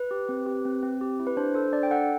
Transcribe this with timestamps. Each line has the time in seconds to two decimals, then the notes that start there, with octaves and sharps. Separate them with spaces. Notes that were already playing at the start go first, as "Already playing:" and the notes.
Already playing: B4
0.11 G4
0.29 C4
0.46 G4
0.65 C4
0.83 C4
1.01 G4
1.20 E4
1.27 B4
1.37 D4 C5
1.55 A4 C5
1.72 D4 D5
1.83 G5
1.91 A4 F#5